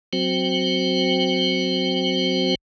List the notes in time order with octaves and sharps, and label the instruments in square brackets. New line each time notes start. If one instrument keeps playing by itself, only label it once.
[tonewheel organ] F#3 C4 F#4 C5 G5